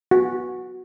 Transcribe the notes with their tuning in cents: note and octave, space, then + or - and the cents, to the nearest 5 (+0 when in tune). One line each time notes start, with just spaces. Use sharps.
F#4 -5